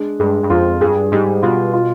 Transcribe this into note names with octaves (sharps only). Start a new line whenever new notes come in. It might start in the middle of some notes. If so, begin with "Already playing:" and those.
Already playing: G#3 D4
G2 G#3
G2
F2 F4
G2 G#4
G#2 G3
B2 F4
F4